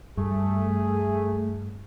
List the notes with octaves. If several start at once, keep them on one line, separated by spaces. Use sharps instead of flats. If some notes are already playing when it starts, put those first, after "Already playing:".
G2 A3 G#4